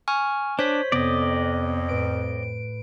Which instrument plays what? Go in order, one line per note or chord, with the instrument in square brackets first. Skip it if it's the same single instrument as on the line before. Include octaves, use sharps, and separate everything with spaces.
[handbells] G#5 C#6 F6
[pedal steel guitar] D4 [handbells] C5 C#5 B6
[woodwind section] F2 [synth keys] C3 B3 [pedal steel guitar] D5 D#5
[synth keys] A2 B4 D7